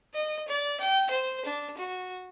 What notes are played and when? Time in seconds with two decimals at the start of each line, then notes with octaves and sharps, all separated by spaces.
0.14 D#5
0.48 D5
0.80 G5
1.10 C5
1.45 D4
1.77 F#4